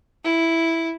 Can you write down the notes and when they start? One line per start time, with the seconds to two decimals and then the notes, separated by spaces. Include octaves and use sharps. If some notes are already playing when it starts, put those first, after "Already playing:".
0.24 E4